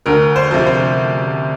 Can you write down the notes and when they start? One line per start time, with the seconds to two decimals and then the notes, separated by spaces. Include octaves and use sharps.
0.06 D2 A#4
0.36 C5
0.51 C3 F3
0.67 C5